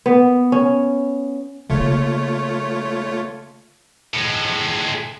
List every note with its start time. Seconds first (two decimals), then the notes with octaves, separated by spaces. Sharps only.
0.06 B3
0.52 C#4
1.69 C#3 A3 A#3 F4 C#5
4.14 A2 G#3